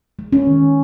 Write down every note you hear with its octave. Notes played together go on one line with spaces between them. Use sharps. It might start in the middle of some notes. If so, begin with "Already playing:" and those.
G#3
C#4
D#3